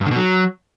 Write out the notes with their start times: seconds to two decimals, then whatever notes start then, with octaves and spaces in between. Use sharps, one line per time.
0.01 G2
0.06 D3
0.11 B2
0.16 F#3